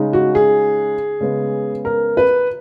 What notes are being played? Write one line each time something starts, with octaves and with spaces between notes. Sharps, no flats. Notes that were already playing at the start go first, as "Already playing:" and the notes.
Already playing: C#3 G#3 D#4
F#4
G#4
C#3 G#3 B3
A#4
B4